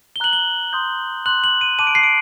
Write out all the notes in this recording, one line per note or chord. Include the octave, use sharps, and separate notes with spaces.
G7
A#5 F#6 F#7
G7
C6 D#6 G6
C6 F#6 F#7
F#7
D#7
A5 D6 F#6 D#7
D7
C7
D7